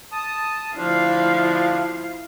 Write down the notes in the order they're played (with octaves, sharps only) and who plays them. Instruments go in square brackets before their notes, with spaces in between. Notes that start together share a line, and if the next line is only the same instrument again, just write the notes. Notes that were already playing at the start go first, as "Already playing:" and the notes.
[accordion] A5 D#6
[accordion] D2 D4 [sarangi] F3 [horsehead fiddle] E4 F5